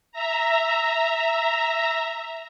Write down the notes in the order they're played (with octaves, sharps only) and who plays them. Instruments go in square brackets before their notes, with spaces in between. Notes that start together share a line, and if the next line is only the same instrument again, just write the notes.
[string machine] E5 A#5